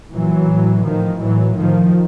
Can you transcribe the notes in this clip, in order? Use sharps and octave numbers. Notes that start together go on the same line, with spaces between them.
A#2 E3 F#3
A2
A2 D#3 F3
A2 E3 F#3
A2 D#3 F3